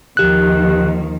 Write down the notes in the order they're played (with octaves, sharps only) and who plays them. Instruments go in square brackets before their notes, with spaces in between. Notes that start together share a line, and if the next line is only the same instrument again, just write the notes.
[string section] D#2 D#3 F3 [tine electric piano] G4 F#6